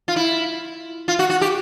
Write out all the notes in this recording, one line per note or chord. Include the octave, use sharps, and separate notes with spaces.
F4
E4
F4
F#4
F#4
G4